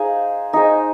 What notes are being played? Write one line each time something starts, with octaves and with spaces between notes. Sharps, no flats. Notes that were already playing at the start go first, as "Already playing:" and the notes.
Already playing: D#4 G#4 C5 F5
D#4 G#4 C5 D#5